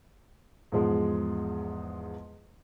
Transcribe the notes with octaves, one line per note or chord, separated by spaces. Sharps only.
E2 G#2 F3 G#3